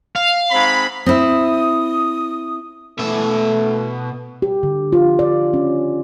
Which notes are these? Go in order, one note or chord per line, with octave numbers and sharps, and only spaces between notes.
F5
G#2 C4 B5
C4 E4 D#6
B2 A3 E5
G4
D3
F4
D5
C#4